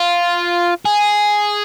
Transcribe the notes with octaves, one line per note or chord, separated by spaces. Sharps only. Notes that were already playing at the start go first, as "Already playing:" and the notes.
Already playing: F4
G#4